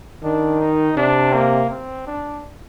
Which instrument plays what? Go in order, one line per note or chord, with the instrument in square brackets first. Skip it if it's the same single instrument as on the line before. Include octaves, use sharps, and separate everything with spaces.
[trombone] D#3 [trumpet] D4
[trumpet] D#4
[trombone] C3 [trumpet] D4
[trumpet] A#3
C4
D4